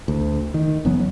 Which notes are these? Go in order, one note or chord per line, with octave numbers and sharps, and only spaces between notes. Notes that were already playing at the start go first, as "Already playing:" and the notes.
D2
D#3
F#1 E3 F#3 B3